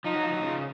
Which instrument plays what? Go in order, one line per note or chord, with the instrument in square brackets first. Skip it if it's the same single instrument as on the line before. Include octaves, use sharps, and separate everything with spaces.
[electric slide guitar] F3 [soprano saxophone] D#4
[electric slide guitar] F#3
F3
F#3
C#3 F3